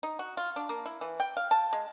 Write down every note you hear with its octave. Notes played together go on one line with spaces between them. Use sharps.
D#4
F#4
F4
D4
A#3
E4
E3
G5
F5
A5
G#3